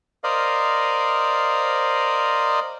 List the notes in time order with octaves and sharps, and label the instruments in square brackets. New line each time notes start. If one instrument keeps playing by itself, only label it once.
[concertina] A#4 C5 D5 D#5 F5